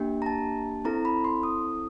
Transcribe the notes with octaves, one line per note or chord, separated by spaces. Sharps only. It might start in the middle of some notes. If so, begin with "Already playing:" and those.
Already playing: A#3 D4 G4
A#5
A5
C4 E4 A4 A#5
B5
C6
D#6